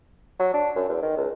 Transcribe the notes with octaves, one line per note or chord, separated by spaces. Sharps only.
F#3
D4
F#2
E2
D#3
C#2